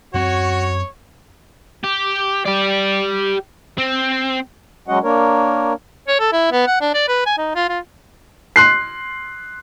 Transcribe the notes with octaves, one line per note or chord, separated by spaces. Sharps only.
F#2 C4 F#4 C#5
G4
G4 D5
C4
F#3 G#3 C#4 F#4 D#5 F#5
A#3 D4 A#4 C#5
C#5
A4
E4
B3
F#5
D4
D5
B4
G#5
D#4
F4
F4
C6 F#6 C7